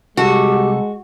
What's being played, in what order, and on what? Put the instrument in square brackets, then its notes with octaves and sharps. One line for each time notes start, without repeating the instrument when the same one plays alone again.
[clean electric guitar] C2 A4 [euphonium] G#3 [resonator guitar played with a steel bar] F#4 [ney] G4